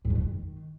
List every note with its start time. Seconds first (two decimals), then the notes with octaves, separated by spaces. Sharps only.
0.05 G#2
0.10 F2
0.15 G2
0.21 D#3